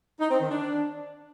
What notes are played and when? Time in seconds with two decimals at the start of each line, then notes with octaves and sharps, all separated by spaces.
0.20 D#4
0.30 C4
0.40 D#3
0.50 D4